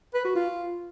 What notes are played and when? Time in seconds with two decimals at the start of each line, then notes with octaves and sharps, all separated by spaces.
0.14 B4
0.25 F#4
0.35 F4